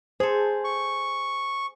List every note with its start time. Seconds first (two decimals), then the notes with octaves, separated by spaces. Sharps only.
0.20 G#4 A4 C5
0.64 C#6